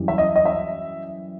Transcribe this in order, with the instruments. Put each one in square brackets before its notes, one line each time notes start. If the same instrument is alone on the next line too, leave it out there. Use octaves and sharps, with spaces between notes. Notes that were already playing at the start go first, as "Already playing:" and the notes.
Already playing: [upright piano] F#2 E3 G3
E5
D#5
D#5
E5